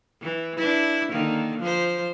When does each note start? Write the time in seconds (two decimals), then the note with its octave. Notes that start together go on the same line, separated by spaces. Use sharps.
0.21 E3
0.58 D4 E4
1.11 D3 D#3 A#3
1.59 F3 C5